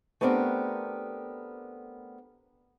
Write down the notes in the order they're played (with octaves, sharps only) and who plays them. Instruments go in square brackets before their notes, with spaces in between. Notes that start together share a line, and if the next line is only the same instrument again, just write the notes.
[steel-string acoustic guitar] A3 B3 C4 D4 G4 A#4